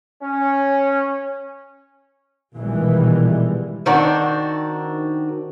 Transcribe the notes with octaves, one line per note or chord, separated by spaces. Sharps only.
C#4
A#1 B2 D#3 E3 G3 G#3
D#3 C4 D4 F#4